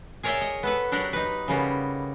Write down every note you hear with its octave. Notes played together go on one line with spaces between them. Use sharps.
G#4 A#4 C#5 D5 E5 G5
D#5
B3 A4 B4
F#3 D4 G4 A#4 F#5
D#4 B4
C#3 G3 A#3 B3